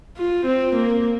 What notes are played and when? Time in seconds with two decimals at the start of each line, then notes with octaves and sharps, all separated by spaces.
0.17 F4
0.46 C4
0.76 A#3